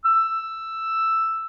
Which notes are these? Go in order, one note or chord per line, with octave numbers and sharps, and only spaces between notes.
E6